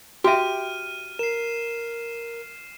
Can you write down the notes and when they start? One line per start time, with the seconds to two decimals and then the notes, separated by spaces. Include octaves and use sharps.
0.24 F#4 G4 E5 F6 D#7
1.19 A#4 C7 E7